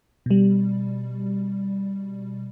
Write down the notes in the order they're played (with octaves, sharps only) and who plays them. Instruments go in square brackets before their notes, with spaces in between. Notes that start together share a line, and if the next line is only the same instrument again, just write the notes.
[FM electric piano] B2 G3